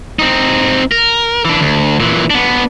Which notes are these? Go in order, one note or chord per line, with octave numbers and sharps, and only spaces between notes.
C4 D#4
A#4
E3 D4
D2
A#2 E3
B3 D4